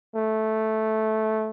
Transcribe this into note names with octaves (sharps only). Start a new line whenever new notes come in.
A3